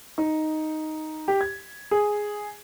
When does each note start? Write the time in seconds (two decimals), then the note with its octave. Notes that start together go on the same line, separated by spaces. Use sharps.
0.18 D#4
1.28 G4
1.41 G#6
1.91 G#4